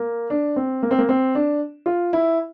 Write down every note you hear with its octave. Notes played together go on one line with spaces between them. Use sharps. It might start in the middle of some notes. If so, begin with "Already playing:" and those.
Already playing: A#3
D4
C4
A#3
C4
A#3
C4
D4
F4
E4